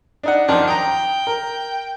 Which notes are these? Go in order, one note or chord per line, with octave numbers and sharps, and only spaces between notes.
D4 D#4 F#5
F#2 D#3 F3 D4
G5 A#5 D#6
A#4